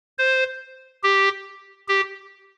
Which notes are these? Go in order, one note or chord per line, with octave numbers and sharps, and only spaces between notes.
C5
G4
G4